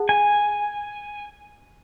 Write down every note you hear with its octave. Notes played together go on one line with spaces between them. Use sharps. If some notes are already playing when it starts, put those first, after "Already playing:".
Already playing: G#4 F#5 A5
G#5